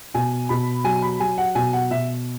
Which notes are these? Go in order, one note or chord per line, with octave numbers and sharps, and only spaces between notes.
B2 G#5
B2 B5
F#3 G#5
B5
F#3 G#5
F#5
B2 G#5
F#5
B2 E5